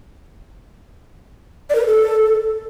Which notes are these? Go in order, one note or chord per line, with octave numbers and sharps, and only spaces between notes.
D5
A#4
B4
A4